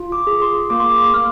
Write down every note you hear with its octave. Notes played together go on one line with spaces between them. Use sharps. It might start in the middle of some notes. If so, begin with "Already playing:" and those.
Already playing: F4
D6
G#4
C6
A#3 D6
C6
D6
A#3 F6